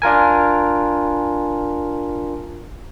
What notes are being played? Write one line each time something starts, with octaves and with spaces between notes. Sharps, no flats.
D4 F4 A#4 G#5